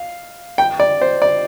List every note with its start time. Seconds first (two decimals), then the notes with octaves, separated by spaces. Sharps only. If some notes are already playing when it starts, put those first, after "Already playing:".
Already playing: F5
0.58 G5
0.80 D5
1.02 C5
1.22 D5